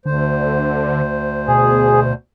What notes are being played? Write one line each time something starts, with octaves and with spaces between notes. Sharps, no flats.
D2 D3 C5
B2 G#4